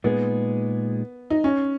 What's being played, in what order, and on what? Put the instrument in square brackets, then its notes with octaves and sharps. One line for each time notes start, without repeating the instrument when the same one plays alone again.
[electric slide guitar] A#2 G#3 D#4 G#4 [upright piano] B3
[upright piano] D#4
C#4